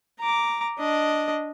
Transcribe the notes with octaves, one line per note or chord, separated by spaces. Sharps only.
A#5 D6
D4 D#5